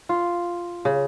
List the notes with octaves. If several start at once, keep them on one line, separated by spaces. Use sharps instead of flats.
F4
C#3